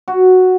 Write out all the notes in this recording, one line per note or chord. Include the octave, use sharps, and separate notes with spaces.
F#4